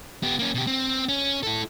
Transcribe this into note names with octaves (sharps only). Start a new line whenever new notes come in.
B3 G4
A#3 C#4
B2 G4
C4
C#4
E4 A4